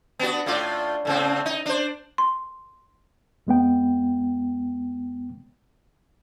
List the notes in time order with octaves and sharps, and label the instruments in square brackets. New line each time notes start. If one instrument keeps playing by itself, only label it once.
[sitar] B3 D4 F#4
A2 F4 D5
A2 C#3 C4
D#4
D4 C5
[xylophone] C6
[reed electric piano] F2 G#3 B3 G5